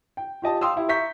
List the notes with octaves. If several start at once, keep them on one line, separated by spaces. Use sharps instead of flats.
G5
F4 G4 D#5 A5
F5 G5 C6 D#6 E6
E4 G4
E5 A#5 C#6 G6 B6